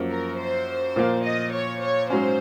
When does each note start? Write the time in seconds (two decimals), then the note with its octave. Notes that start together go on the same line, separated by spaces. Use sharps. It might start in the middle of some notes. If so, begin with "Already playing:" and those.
Already playing: F#2 F3 A#3
0.09 A#4
0.39 C5
0.96 A#2 F3 A#3
1.25 D#5
1.53 C#5
1.82 C#5
2.10 G#2 F#3 C#4 C5